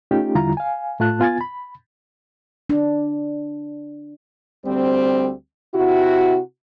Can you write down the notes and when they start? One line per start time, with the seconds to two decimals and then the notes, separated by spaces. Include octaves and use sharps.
0.11 A3 C#4 D#4 F4 G4
0.35 E2 D3 G3 E4 F4 A#5
0.57 F5 G#5
1.00 A2 A3 F4 A5 F#6
1.20 B3 F4 G#5 G#6 A6
1.41 B5
2.70 D4
4.66 D2 G3 C4
5.75 C3 E4 F#4